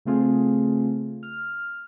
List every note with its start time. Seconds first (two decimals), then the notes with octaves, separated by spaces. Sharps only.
0.05 C#3 A3 C4 F4 G#4
1.23 F6